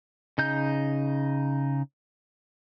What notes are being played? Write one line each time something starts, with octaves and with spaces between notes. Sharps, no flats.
C#3 D#4 G6